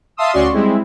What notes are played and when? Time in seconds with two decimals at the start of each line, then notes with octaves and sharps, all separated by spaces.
0.17 E5 F5 A5 C6 D#6 E6
0.32 D2 C#4 F#4 D5 C6 C#6
0.53 G3 G#3 C4 E4